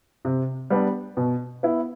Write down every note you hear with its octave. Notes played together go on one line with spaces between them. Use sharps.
C3
G3 B3 D4
B2
B3 E4